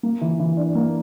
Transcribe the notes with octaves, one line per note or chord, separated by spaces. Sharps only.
A#3
E3
E3
D4
A#3